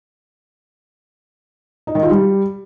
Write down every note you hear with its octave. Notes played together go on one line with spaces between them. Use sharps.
D#4
D#3
F4
G3